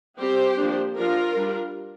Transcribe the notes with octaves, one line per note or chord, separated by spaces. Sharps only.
G3 C4 G4 C5
F3 A#3 D4
F3 D4 F4 A#4
G3 D4